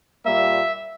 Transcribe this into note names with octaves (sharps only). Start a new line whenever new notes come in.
A#2 G3 A#3 E5